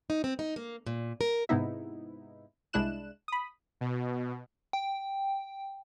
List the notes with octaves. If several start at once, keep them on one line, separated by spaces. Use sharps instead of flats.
D#4
C4
D#4
A#3
A#2
A#4
G#2 C3 B3 D#4 E4
C2 G#3 D4 E4 F#6 E7
B5 D#6
B2
G5